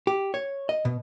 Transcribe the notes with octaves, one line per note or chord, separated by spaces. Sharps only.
G4
C#5
D#5
B2